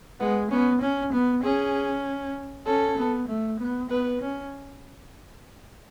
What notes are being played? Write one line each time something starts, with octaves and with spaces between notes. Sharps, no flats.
G#3 B3
B3 C#4
C#4
B3
C#4 G#4
C#4 A4
B3
A3
B3
B3 B4
C#4